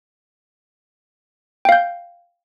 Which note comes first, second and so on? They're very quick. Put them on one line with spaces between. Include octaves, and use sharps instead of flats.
G5 F5 G6